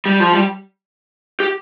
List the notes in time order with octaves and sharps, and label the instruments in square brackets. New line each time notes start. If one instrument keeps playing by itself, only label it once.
[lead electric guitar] G3
F3
G3
G4